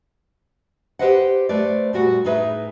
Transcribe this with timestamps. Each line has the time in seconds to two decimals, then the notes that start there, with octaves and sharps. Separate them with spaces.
0.99 G4 G#4 B4 C5 D#5 F#5
1.49 A3 B4 C5 D5
1.93 A#2 G3 F#4 F#5
2.25 A2 D#4 G#4 B4 E5